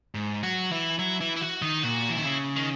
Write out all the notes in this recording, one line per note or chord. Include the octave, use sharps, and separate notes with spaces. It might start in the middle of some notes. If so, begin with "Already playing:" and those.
G#2
F#3 F#4
E3 E4
F#3 E4
E3 E4
E4
F#4
D#3 D#4
A#2 F#4
E3 E4
D#3
C#3
D#3